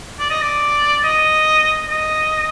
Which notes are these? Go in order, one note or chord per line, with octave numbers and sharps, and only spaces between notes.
D5
D#5
D5
D#5
D#5